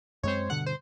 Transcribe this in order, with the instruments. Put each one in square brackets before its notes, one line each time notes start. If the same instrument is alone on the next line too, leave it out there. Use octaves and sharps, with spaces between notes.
[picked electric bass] F#2 G#3 C4 [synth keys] C5 C#5
[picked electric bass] G2 B2 D3 [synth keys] F#5 F#6
[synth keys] C5